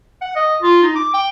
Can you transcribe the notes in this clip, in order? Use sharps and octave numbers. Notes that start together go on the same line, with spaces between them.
F#5
D#5
F4
D#4
D6
G5